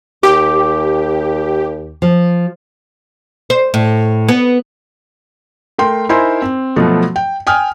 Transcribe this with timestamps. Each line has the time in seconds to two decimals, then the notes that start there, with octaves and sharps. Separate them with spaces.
0.23 D#2 G4 D6
2.02 F3
3.50 C5
3.74 A2
4.28 B3
5.78 A3 A#4 G5 C6
6.09 D#4 E4 A#4 C5 G#5 C6
6.42 C4
6.76 B2 F3 F#3 A3 B3
7.16 G5
7.47 G5 G#5 D#6 F6